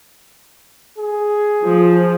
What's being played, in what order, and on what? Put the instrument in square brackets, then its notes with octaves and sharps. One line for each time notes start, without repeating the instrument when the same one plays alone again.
[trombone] G#4
[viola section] F3